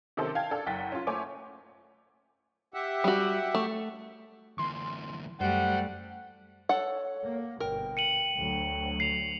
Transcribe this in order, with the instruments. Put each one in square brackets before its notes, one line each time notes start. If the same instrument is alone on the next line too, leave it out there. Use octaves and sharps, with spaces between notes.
[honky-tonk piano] C3 D#3 C#4 A4 C5
F5 G5 A5 G#6
D4 A4
F#1 F#5 G5 A6 B6
C#4 F4
A3 C5 C#5 G#5 D6
[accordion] G4 E5 F#5
[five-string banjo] G3 F#4
A3
[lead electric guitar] D2 E3 [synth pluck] C6
[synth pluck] F#2 [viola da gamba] G3 A3 [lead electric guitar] C5 [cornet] F#5
[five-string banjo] A4 F#5 [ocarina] C#5
[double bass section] A#3
[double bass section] G1 B2 [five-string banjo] A#4 [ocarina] G5
[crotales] C#7 D#7 F#7
[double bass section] D2 F#3
[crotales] C7 F7